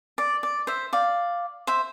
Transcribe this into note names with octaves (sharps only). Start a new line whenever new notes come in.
D5
D5
C5 E5
D5 F5
C5 E5